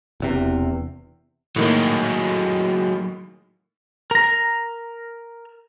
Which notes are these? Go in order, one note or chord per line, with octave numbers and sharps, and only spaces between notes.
E1 E2 C3
A2 D#3 F#3 G#3 A#3
A#4 A#5